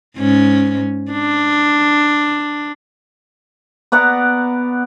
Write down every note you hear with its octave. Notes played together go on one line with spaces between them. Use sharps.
G#2 C#4
D4
B3 D5 F#5 A#5